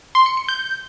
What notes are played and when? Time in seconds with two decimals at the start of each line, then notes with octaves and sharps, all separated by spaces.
0.15 C6
0.26 C#7
0.37 C#7
0.49 G6